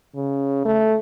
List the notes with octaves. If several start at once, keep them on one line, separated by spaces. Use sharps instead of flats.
C#3
A3